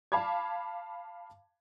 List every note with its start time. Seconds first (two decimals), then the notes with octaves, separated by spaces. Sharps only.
0.12 F5 A5 B5 D6 G#6